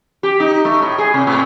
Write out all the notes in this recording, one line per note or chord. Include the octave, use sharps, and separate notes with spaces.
G4
D#4
A3
A2
G#4
C3
A2